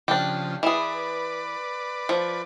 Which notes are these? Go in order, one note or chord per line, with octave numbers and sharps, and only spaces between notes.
C#3 F3 D4 G4
E3 G#4 B4 D5
F3